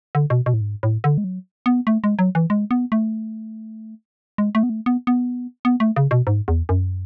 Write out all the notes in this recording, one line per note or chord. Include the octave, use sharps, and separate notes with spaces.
D3
B2
B2
A2
G#2
A2
D3
G#3
F#3
B3
A3
G#3
F#3
E3
G#3
B3
A3
G#3
A3
B3
A3
B3
B3
B3
A3
C#3
B2
G#2
E2
F#2